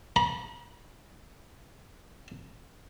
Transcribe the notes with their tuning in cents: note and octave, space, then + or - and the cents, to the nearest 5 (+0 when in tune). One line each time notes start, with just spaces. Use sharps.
B5 -45